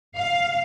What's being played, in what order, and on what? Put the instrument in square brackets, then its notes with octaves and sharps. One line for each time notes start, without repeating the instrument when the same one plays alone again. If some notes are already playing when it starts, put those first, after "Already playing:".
[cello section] F5